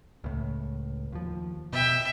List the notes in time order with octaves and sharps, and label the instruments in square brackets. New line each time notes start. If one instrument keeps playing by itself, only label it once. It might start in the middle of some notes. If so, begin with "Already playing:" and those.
[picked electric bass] C#2 A2
D#2 F3
[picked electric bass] B2 [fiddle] E5 G5